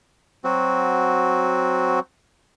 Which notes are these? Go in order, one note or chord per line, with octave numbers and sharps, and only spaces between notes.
F#3 C4 F#4